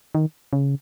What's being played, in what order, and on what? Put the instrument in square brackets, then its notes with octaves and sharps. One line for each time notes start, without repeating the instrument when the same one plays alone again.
[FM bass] D#3
C#3